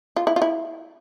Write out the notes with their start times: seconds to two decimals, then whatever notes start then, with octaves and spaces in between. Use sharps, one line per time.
0.16 F4
0.27 E4
0.36 F4
0.42 E4